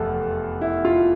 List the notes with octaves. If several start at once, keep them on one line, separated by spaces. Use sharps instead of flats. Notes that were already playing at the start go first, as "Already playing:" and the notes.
Already playing: F1 E2 A4
E4
F4